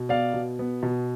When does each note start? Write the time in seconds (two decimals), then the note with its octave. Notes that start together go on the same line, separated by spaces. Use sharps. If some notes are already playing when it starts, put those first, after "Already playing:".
Already playing: B2
0.09 B3 D5 F5
0.34 B2
0.59 B3
0.83 B2